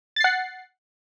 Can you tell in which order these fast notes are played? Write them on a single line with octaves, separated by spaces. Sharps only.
A6 C7 F#5